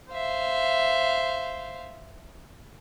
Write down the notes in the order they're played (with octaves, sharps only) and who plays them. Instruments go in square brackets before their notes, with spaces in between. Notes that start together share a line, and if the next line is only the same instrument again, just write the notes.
[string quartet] C5 E5 F5